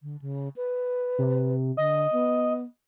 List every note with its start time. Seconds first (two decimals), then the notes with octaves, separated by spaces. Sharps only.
0.03 D3
0.22 C#3
0.56 B4
1.18 C3
1.77 D3 D#5
2.12 B3